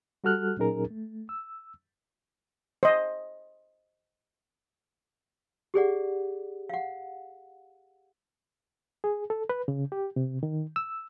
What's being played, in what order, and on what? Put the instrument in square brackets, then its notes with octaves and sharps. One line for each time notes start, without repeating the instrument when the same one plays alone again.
[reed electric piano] G3 F#4 A4 F6 F#6
A#2 F#3 C#4 D#4 G#4 A#4
A3
E6
[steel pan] C5 D#5
[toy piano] G4 G#4 D5 F#5
F5 F#5
[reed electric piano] G#4
A4
B4
C#3
G4
C3
D#3
E6